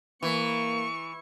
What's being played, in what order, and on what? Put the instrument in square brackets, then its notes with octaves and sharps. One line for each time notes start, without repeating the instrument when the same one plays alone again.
[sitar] E3 [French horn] A#3 [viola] C#6